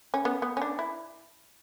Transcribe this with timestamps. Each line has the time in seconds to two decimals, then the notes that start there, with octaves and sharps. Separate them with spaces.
0.14 C#4
0.25 B3
0.42 B3
0.57 C#4
0.62 D4
0.79 E4